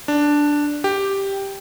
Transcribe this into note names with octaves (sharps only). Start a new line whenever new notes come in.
D4
G4